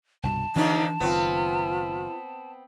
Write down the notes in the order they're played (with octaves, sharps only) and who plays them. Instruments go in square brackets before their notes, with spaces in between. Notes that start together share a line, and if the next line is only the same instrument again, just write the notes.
[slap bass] C2 G2 B2 [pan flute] A5
[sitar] D#2 D3 F3 [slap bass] E3 D4 [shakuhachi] D#4
[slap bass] F#1 D#3 [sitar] B3 C4 [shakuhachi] F4